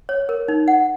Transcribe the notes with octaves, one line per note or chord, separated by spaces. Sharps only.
C#5
A#4
D#4
F#5